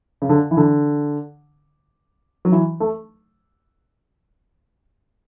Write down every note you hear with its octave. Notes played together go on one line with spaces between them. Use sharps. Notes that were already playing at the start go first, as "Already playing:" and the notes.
C#3
D3
E3
D3
F#3
E3
A3